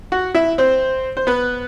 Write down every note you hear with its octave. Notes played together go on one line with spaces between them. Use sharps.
F#4 F#5
E4 E5
C4 C5
C5
B3 B4